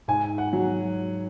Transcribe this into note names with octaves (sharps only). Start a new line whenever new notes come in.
G#2 G#5
F#5
F#3